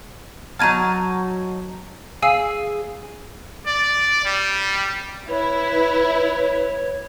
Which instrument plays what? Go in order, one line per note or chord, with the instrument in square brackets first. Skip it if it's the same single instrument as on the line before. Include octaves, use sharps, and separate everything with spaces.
[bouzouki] F#3 D#4 A5 [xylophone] F6 G#6 D#7
[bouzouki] G#4 [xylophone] F5 G#5 E6
[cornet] D5
G3
[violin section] E4 [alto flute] B4 [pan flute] C#5